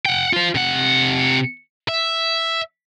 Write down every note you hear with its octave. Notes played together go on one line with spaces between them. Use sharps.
F#5 G5
F4 C5
C3 F#5
E5